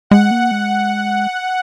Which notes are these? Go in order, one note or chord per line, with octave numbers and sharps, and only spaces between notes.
G#3 F#5
A#3
G#3